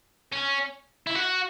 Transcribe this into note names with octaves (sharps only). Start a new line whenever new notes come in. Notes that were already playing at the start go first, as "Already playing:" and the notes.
C#4
E4
F#4